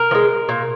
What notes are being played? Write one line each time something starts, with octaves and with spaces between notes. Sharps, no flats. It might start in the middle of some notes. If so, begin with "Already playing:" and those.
Already playing: A#4
F3
G#3
A#2